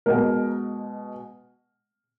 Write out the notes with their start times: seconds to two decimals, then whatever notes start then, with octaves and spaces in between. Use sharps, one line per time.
0.06 B2 G#3 A#4